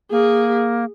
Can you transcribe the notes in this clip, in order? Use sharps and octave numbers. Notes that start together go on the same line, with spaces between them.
A#3 G#4